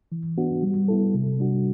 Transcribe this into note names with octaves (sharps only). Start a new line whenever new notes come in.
E3
B3 D4 F#4
G3
B3 E4 A4
C3
G3 D4 F#4